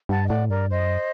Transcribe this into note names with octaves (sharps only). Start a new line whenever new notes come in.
G2 F#5 A5
D#5
A2 D5 F#5
G2 A#4 D5
F#2 C5 D#5